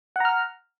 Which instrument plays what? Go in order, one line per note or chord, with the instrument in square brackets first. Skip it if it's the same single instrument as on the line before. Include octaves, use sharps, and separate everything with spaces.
[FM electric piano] F#5
A#5
F6